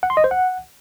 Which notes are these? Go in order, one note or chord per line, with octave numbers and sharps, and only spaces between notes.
F#5
C6
D#5
C5
F#5